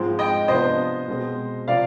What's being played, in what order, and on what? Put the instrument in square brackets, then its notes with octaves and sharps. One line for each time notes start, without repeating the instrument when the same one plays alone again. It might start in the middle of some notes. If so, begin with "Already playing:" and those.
Already playing: [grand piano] G#2 F3 G#3 C4 F4
[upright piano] D#5 G5
[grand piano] C3 F3 B3 D4 [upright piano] C5 D#5
[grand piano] B2 G#3 C4
[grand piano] C3 F3 C4 F4 [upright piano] D5 F5